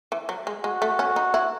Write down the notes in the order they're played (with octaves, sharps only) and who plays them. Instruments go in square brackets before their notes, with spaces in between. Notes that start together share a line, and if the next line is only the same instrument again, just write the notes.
[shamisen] E3
F#3
G#3
[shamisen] G#3 [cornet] F#4
[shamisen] A3
C#4
D#4
E4